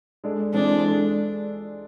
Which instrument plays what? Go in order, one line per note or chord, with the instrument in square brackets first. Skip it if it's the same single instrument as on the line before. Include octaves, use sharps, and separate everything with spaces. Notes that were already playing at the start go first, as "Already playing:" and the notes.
[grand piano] G#3 D4 A4 D5
[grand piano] E3 G#3 C4 G#4 [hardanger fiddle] D4
[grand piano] G#3 D4 A4 D5